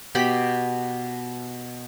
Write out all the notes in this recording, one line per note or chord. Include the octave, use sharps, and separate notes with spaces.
B2 G4 G5 B5